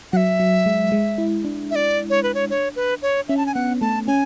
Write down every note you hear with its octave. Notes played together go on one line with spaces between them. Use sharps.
F#3 E5 F#5
F#3
G#3
G#3
E4
D4
E5
D5
C#5
B4
C#5
C#5
B4
C#5
C#4 E5
A5
G#5
B3 F#5
A3 A5
C#4 G#5